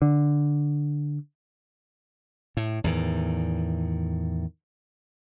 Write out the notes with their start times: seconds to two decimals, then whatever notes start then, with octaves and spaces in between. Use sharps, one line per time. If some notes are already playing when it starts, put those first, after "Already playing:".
0.02 D3
2.57 A2
2.84 E2 A2 D#3